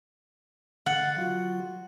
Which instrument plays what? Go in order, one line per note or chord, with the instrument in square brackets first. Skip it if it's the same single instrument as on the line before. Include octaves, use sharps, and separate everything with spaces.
[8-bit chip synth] D3 F5 A6 [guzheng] F#5
[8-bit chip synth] F#3 F4 F#4